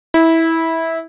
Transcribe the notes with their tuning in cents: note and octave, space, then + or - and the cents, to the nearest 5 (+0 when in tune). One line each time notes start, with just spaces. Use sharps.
E4 -15